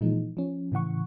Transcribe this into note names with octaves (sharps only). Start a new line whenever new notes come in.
A#2 E3 F3 G#3 D#4
F3 C#4
A2 C#3 E3 F#5 C#6